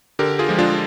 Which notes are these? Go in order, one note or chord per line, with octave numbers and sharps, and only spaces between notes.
D3 G4 A#4
F4 G#4
F3 G#3
D4 F4